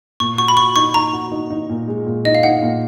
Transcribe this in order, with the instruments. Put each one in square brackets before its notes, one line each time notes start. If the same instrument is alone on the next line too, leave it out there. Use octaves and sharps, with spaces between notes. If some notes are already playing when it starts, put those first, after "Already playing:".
[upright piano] A#2 [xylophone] C#6
[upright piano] F#4 [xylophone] C#6
[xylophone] B5
[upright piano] F#4 [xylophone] C#6
[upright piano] D#4 [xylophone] C#6
[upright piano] D#4 [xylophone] A#5
[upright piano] F#4
D#4
D#4
A#2
G#3
A#2
[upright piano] D#4 [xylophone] D#5
[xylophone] F5
[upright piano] D#4 [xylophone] F#5
[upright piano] A#2